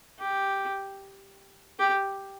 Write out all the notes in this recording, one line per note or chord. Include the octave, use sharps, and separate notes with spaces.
G4
G4